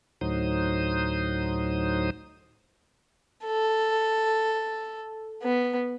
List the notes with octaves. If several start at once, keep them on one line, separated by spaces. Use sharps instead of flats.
D2 A2 F#3 D#4 C5 D#6
A4
B3